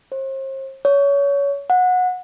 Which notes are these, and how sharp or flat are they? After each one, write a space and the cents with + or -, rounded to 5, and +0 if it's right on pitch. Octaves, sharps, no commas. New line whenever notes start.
C5 +40
C#5 +25
F#5 -20